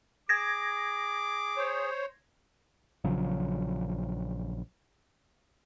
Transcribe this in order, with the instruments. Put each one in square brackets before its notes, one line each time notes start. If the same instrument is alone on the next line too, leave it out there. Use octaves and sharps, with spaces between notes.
[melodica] G#4 [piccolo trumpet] D6 [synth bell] G#6 A#6
[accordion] C5 C#5
[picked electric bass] A#1 C#3 F3 F#3